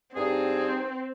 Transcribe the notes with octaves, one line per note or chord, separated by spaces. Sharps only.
G2 C4 D#4 G#4